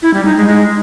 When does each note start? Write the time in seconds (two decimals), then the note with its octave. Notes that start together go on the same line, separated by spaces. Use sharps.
0.02 E4
0.14 G3
0.25 D#4
0.36 G#3
0.48 G#3